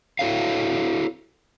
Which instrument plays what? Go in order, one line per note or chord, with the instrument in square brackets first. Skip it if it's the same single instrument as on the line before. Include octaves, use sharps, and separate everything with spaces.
[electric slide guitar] E4 F#4 A4 C#5 F5